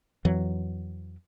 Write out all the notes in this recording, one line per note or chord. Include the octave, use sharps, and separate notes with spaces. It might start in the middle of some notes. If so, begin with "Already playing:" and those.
F2 E3 F#3